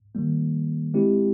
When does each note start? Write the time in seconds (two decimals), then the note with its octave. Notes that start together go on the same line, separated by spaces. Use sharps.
0.15 D#3 G3 A#3
0.94 G#3 C4 E4 G4